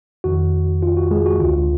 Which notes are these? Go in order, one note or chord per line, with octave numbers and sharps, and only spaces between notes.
F2 D#3 F#4
F4
F#4
G#3 G#4
F#4
D2 D3 F4